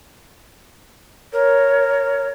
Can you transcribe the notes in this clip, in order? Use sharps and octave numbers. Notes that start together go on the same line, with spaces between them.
A#4 C#5